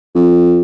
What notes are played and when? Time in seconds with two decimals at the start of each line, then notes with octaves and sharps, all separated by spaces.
0.15 F2